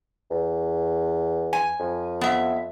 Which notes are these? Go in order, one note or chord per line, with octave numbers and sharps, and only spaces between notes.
E2
G#5
F2
B3 E5